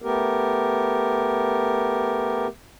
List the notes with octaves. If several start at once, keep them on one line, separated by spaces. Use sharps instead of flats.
A3 B3 G4 A#4